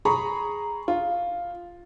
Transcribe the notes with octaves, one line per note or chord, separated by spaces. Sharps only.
G#4 A#5 B5 C#6 D#6
F4